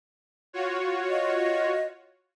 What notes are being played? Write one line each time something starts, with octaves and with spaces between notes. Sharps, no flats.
F4 F#4 C#5
D#5